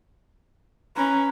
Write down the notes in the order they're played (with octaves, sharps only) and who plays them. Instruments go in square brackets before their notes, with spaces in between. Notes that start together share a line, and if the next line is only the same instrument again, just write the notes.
[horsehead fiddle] C#4 [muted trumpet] B4 [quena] A#5